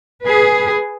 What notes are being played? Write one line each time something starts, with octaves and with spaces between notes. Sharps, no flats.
G#4 B4